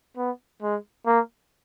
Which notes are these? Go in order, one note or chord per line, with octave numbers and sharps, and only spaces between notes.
B3
G#3
A#3